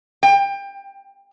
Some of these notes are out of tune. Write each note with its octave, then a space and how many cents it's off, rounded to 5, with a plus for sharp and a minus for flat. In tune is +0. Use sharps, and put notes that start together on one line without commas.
G5 +25